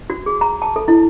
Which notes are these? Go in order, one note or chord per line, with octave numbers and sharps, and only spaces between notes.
F#4
G#4
A#5
A5
A4
E4